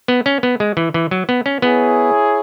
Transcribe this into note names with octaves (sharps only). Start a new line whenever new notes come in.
B3
C#4
B3
G#3
E3
E3
F#3
B3
C#4
B3 E4 G#4 C#5